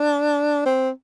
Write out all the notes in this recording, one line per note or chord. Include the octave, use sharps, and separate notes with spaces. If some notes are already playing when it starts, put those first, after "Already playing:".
Already playing: D4
C4